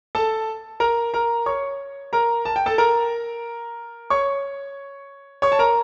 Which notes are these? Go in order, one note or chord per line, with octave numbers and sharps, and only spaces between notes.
A4 A5
A#4 A#5
A#4 A#5
C#5 C#6
A#4 A#5
A5
G5
A4 A5
A#4 A#5
C#5 C#6
C#5 C#6
A5
A#4 A#5